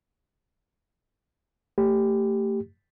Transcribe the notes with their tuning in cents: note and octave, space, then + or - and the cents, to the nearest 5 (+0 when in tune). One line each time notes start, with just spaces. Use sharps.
A3 +25 G4 +0